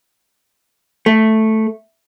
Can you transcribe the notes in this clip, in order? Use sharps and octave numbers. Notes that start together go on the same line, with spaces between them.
A3